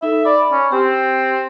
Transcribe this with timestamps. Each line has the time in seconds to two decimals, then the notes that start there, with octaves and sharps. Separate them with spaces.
0.02 D#4 A4 E5
0.25 D5 B5
0.52 C#4
0.72 C4 G4